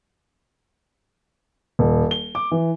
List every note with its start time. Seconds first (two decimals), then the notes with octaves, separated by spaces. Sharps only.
1.79 D#1
2.11 G7
2.35 D6
2.51 E3